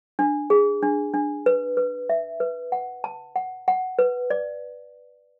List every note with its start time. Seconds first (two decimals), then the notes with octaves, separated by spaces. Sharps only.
0.19 D4
0.50 G#4
0.83 D4
1.14 D4
1.46 B4
1.77 B4
2.09 E5
2.40 B4
2.72 F#5
3.04 A5
3.36 F#5
3.68 F#5
3.99 B4
4.30 D5